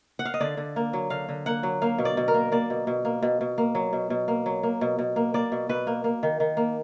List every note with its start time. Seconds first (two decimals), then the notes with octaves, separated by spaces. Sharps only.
0.19 F#5
0.25 F5
0.34 D#5
0.40 D3 D5
0.57 D3
0.76 A#3
0.93 F#3
1.10 D3 F5
1.29 D3
1.46 A#3 F#5
1.63 F#3
1.82 A#3 F5
1.98 B2
2.05 D5
2.17 B2
2.28 A#4
2.34 A#3
2.52 A#3 D5
2.70 B2
2.87 B2
3.05 A#3
3.23 B2
3.41 B2
3.58 A#3
3.75 F#3
3.93 B2
4.10 B2
4.28 A#3
4.46 F#3
4.63 A#3
4.81 B2
4.99 B2
5.16 A#3
5.34 A#3 D5
5.52 B2
5.69 B2 B4
5.87 A#3
6.04 A#3
6.23 D#3
6.40 D#3
6.57 A#3